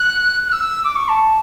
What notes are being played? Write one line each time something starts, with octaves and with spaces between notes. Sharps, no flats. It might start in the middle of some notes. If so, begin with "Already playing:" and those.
Already playing: F#6
F#6
E6
D6
C#6
A5